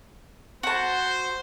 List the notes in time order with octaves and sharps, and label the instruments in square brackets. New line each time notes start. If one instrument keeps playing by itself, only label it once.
[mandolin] F#4 A5 [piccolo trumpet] C5